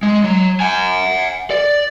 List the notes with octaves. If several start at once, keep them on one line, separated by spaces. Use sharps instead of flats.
G#3
F#3
F#5 G#5
D5